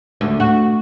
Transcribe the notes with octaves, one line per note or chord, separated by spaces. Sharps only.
D2
F#4